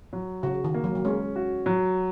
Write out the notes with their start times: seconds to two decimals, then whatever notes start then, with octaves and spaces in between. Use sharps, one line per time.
0.13 F#3
0.43 C#3 F#4
0.64 D#3
0.74 A#3
0.84 F#3
0.95 F#3
1.05 G#3 C#4
1.36 F#4
1.66 F#3